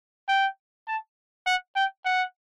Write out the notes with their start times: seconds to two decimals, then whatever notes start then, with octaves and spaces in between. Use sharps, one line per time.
0.29 G5
0.88 A5
1.46 F#5
1.76 G5
2.05 F#5